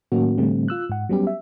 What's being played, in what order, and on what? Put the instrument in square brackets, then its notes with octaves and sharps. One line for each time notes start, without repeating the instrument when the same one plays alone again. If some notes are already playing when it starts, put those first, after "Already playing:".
[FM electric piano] A2 D#3 F#3 A#3 C#4 F#4
A2 D3 E3 G3 A3 C4
F4 E6 F#6
G#2 F#5
F#3 G3 B3 C#4 G4
E5